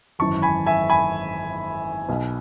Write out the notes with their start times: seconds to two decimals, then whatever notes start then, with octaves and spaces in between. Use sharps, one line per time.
0.19 G#1 F#2 E3 A5 C#6
0.42 G#5 B5
0.66 E5 G#5
0.90 G#5 B5
2.08 B1 B2